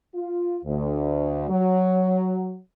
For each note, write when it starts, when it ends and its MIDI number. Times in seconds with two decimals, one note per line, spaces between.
0.14 0.58 65
0.64 1.49 38
1.49 2.58 54